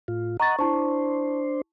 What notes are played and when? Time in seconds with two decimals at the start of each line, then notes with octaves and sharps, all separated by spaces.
0.08 A2 F4
0.40 D#5 F#5 A#5 C#6 A6
0.59 D4 E4 C5 A5 C#6